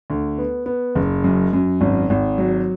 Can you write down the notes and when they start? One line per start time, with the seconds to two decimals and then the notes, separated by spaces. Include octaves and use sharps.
0.10 D2
0.38 B3
0.66 B3
0.95 F#1
1.24 F#2
1.53 F#2
1.81 G#1
2.10 G#1
2.38 F#3